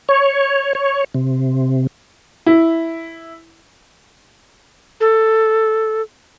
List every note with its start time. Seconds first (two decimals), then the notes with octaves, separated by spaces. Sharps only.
0.09 C#5
0.75 C#5
1.14 C3
2.46 E4
5.01 A4